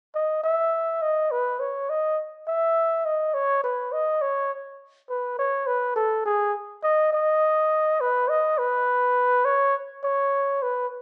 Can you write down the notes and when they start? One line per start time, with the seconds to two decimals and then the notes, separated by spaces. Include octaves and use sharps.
0.15 D#5
0.44 E5
1.02 D#5
1.31 B4
1.60 C#5
1.90 D#5
2.48 E5
3.06 D#5
3.34 C#5
3.64 B4
3.93 D#5
4.22 C#5
5.10 B4
5.39 C#5
5.67 B4
5.96 A4
6.26 G#4
6.83 D#5
7.13 D#5
8.01 B4
8.29 D#5
8.59 B4
9.45 C#5
10.04 C#5
10.62 B4